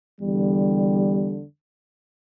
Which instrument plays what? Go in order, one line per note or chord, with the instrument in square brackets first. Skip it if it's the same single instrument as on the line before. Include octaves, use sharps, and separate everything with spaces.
[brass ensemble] E2 D3 G3